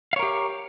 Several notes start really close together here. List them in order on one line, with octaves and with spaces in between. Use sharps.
F5 C#5 A#4 G4